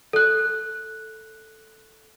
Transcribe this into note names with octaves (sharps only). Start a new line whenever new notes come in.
A4 F#6